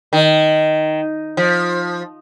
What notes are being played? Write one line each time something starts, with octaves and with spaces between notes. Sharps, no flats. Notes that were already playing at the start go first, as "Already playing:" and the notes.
D#3
F3